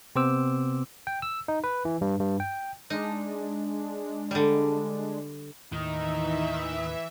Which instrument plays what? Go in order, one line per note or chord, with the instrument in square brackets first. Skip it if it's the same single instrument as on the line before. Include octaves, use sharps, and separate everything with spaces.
[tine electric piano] C3 B3 C4 C5 D6 E6
G5
E6
D#4
B4
E3
G2
G2
G5
[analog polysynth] G#3 D4 [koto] D#4
[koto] D3 G3
[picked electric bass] D#2 A2 [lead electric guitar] D#3 [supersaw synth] E3 E5 [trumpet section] D#4